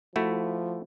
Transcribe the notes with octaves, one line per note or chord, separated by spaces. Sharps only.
F3 A3 E4 F#4